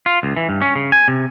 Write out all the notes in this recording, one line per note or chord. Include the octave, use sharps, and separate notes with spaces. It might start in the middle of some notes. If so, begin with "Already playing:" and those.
F4
C#2
E3
G2
C#4
C#3
G#5
C3